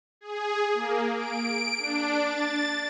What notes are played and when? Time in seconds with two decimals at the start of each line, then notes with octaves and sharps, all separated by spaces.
0.21 G#4
0.74 A#3
1.16 D7
1.78 D4
2.24 A6